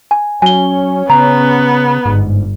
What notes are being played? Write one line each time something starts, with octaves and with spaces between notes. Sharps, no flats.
G#5
F#3 C#4 G#5 G7
C#3 B3 A#5
G1 G#2